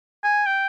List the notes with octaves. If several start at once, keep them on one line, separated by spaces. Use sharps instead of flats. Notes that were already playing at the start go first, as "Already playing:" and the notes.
G#5
G5